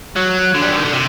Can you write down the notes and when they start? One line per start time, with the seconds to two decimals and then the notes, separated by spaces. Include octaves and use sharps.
0.16 F#3
0.54 D3
0.62 G3
0.70 F#3
0.77 D#3
0.85 D3
0.92 C3